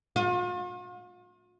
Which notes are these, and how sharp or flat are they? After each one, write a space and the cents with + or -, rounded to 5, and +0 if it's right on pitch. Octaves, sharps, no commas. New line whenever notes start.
F4 +45